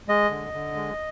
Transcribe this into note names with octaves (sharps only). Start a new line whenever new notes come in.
G#3 D#5
D3
D3
G#3